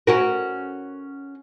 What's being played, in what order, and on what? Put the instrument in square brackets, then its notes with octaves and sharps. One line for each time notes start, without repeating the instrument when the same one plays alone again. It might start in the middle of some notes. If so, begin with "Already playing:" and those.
[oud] C#4 F#4 A#4